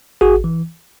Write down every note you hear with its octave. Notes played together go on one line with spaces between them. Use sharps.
G#1 F#4 G#4
E3